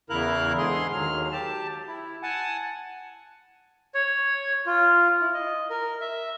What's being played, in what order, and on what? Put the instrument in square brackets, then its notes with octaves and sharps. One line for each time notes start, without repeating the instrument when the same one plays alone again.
[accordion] E2 C#3 E4 A#4 F5 F#6
G#2 D3 G#4 C6
D#2 F#3 F6
G4 A5
E4
F#5 G#5 A5
[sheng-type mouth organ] C#5
F4
E4
D#5
A#4
E5